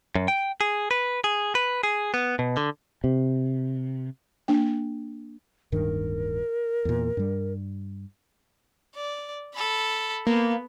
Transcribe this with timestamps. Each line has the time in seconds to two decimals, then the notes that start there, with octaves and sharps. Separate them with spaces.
0.15 F#2
0.28 G5
0.61 G#4
0.91 B4
1.24 G#4
1.55 B4
1.83 G#4
2.14 B3
2.39 B2
2.57 D3
3.04 C3
4.48 A#3 D4 G5
5.72 D1 G2 D#3 A#4
6.85 E2 A#2
7.17 G2 G3
8.95 D5
9.55 A4 B5
10.27 A#3 B3